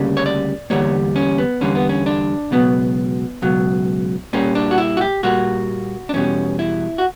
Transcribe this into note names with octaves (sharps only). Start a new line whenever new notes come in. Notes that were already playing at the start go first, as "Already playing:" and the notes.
Already playing: D2 C#3 G3 A#3
C#5
D5
E2 D3 G3 A#3 C#5
C#4
B3
E2 D3 G3 A#3 C#4
B3
C#4
D4
C#2 B2 F#3 B3
C#2 B2 F#3
A#2 G3 A#3 C#4
D4
F#4
E4
F#4
G4
A#2 G3 A#3 F#4
D4
E2 B2 G3 C#4
E4
F#4